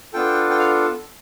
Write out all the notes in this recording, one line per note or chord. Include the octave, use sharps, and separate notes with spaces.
B3 D4 F4 A4 G5
G5
F5